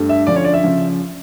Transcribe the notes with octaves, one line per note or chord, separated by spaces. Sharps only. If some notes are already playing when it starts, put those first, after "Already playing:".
Already playing: G2 A3
E5
D3 F3 C#4 D5
C#5
D5
E5
C#3 F3 C#4